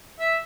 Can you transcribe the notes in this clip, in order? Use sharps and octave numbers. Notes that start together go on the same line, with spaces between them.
E5